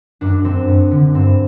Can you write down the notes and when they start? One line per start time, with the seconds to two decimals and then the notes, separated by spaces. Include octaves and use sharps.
0.21 F#2 D4
0.44 F#2 C4
0.68 F#2
0.91 D3
1.14 G2 C4